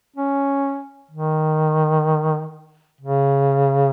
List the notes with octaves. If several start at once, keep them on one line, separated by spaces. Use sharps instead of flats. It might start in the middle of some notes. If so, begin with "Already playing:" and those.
C#4
D#3
C#3